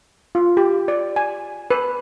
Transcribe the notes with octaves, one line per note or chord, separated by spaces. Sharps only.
F4
G4
D5
G#5
B4